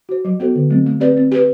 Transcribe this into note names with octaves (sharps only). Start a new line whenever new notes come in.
F#4 C5
F#3
B3 F#4 A4 C5
D3
F#3 A3 C4
A3
C4 G4 B4 D5
C4
G4 B4